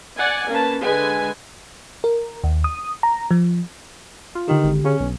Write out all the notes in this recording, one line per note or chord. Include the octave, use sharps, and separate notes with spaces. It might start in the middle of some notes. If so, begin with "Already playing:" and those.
D5 F#5 G#5
A#3 C#4 B4 A5
D3 G#3 B4 G#5
A#4
D#2
D#6
A#5
F3
F4
D3 D#3 G4
G#1
C#3 C#4
B1